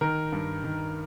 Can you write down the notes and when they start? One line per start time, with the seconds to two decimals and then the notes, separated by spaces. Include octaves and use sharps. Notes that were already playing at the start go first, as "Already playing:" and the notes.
0.01 D#3 A#4
0.32 G2
0.64 D#3